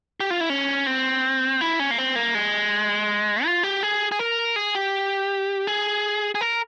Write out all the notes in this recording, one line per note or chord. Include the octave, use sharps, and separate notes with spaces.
G4
F4
E4
C#4
C4
E4
C#4
A#3
C4
A#3
G#3
F4
G4
G#4
G#4
A#4
G#4
G4
G#4
G#4
A#4